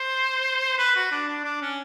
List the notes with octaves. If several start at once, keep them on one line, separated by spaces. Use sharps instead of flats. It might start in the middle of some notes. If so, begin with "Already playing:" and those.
Already playing: C5
B4
F#4
D4
D4
D4
C#4